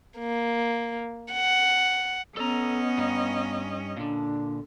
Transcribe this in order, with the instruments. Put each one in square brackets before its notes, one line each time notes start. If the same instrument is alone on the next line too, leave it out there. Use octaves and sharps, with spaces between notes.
[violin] A#3
F#5
[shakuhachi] B3 [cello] C#4 D#5 [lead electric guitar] A4 A#5
[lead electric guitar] G2 D#4
[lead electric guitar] A#2 D3 [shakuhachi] D4